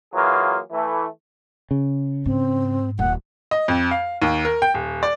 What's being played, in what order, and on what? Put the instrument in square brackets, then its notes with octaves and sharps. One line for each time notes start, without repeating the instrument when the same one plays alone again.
[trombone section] E3 F#3 A#3 F4 G#4
E3 A3
[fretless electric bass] C#3
[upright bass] G#2 [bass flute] C4
[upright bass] D#1 [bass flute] F#5
[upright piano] D#5
F2
F5
D#2
A#4
G5
D#1
D5